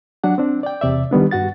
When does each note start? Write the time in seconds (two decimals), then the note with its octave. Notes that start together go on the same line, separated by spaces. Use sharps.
0.24 F#3 D4 F#5
0.38 C4 D4
0.63 D5 G5
0.81 E2 C3 D5 E5
1.11 D#3 G3 B3 D4
1.31 G2 F#4 F#5 A6